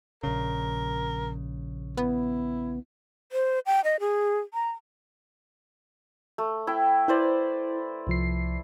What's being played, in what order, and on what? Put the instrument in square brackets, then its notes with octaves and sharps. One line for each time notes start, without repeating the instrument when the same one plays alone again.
[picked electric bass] A#1 C#3 [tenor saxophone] A#4
[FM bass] B3 [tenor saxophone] E4
[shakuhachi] C5
G5
D#5
G#4
A#5
[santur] A3
E4 G5
[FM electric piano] E4 [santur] B4 C5 D5
[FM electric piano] C2 F3 C7